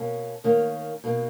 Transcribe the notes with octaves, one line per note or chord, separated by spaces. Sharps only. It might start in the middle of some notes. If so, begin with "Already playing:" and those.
Already playing: B2 A#3 C#4
D#3 A#3 C#4
B2 A#3 D#4